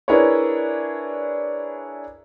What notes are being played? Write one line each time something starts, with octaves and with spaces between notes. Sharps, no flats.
D4 E4 G#4 A#4 B4 C#5